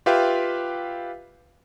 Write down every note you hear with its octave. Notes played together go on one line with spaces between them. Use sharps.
F4 G4 B4 E5 F5 G5